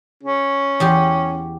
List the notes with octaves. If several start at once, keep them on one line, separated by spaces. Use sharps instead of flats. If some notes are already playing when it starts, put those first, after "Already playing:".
C#4
E2 G4 C6